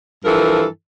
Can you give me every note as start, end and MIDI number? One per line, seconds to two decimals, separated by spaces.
0.24 0.64 43
0.24 0.64 52
0.24 0.64 53
0.24 0.64 69
0.24 0.64 70